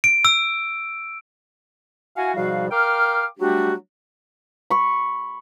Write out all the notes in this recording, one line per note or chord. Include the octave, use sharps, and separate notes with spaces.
D7
E6
E4 F#4 F5 F#5 G#5
G#2 B2 F3 G3 F#4 F5
A#4 F5 G5 D6 F6
F#3 G3 A3 D4 F#4 G4
B5 C#6